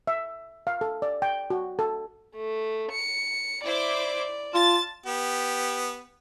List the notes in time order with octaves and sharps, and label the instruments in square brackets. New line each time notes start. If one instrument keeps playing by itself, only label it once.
[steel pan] E5
F5
A4
D5
G5
F#4
A4
[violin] A3
C#7
[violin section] E4 C5 D6 [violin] D5
[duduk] F4 [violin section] A5 A6
[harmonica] B3 G4